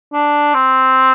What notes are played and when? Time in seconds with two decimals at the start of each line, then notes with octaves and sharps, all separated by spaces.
0.13 D4
0.54 C4